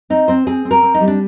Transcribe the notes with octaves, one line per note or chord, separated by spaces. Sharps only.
C4 D#4
C4 C5
C4 G#4
C4
A#4
C4
D#4
G3
D4